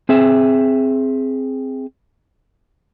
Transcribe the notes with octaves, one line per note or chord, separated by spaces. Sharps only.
C4 G#4 E5